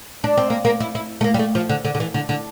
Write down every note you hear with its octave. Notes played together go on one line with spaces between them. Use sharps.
D4
C4
A#3
A#3
E4
E4
A3
A#3
G3
A3
F3
D3
D3
D3
E3
D3
D3